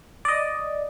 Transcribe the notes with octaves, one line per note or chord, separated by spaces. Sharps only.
D5 D#5